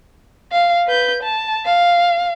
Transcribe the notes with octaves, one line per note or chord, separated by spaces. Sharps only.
F5
B4 G6
A5
F5